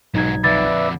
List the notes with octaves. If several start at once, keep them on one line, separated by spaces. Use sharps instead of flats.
B1 G#2 F#3 D#4 G#6
F2 D3 B4 D5 E5 A6